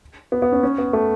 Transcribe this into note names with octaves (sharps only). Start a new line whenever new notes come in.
B3
B3
C#4
C#4
B3
A3